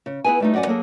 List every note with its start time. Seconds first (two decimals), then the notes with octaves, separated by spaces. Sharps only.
0.06 C#3
0.24 B3 E4 F#4 G#4 B4 G#5
0.40 G3 A3 D#4
0.54 F#2 F#4 D5 F#5 G#5
0.66 F#3 A#3 G#4 A4